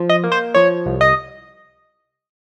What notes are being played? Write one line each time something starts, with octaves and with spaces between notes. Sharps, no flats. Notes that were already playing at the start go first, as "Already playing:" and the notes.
Already playing: F3
D#5
A#3
C5
F3 C#5
C2
D#5